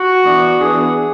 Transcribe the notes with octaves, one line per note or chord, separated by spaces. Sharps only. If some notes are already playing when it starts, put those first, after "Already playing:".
Already playing: F#4
E3 B3 D4
E3 B3 D4 G#4